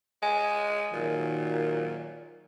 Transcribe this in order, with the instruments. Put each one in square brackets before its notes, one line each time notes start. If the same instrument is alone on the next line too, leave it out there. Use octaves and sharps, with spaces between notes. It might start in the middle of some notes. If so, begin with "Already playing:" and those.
[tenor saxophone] G#3 [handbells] G#5
[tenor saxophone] A#2 [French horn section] D#3 F#3 A#4